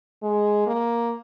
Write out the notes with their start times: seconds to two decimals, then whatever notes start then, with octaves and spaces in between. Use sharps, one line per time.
0.23 G#3
0.67 A#3